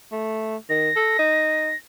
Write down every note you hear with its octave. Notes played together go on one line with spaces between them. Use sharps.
A3
D#3 A#6
A4
D#4